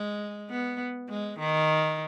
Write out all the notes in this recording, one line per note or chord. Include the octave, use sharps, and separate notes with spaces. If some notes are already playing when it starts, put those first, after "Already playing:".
Already playing: G#3
B3
G#3
D#3